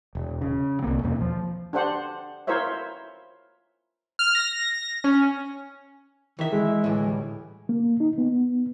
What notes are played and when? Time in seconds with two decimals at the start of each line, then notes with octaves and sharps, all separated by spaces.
0.15 E1
0.41 C#3
0.82 C2 F#2 A#3 C4
1.03 E2 B2 A#3
1.21 F3
1.73 D4 G4 C5 F#5
2.47 E4 F4 A#4 C5 C#5 E5
4.19 F6
4.35 A#6
5.04 C#4
6.39 D#3 E3 E5
6.52 G#3 E4
6.84 D2 A2 E3
7.04 G3
7.69 A#3
8.00 D#4
8.18 B3